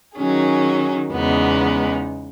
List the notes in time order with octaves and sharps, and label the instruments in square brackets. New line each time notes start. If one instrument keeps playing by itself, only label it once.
[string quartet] D#3 F#3 C#4 G#4
E2 C#3 G#3 B3 D#4